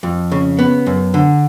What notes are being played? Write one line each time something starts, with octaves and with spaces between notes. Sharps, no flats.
F2
C#3
B3
F#2
D3